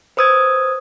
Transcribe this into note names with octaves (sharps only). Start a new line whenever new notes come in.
B4 C5 D#6 E6 G#6